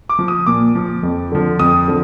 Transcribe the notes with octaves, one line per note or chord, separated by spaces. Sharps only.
D6
F3
D#6
A#2 D6
F3
F2
D3 F3
F2 D#6
D3 F3